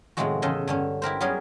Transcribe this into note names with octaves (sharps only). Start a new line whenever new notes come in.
A2 C3 D#3 F3 G#3 F#4
E2 C#3 A4 D#5 E5 C6
G2 D3 C#4
E4 G4 A#4 C5
F#3 G3 B3 C#4 G#4 A#4